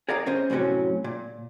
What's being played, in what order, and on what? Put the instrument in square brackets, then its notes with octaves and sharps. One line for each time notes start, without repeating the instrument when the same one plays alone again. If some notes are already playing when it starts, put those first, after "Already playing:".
[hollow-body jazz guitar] G#4 A#4 D5 D#5 F5 A#5
C#4 C5 D#5
F#2 A2 C3 F#3 C#4
A#2